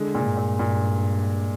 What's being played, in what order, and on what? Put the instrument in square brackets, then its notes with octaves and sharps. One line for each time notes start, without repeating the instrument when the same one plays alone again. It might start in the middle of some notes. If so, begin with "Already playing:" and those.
Already playing: [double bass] D3 [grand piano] G#3
[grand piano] A#2
[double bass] G2
[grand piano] A#2
A#2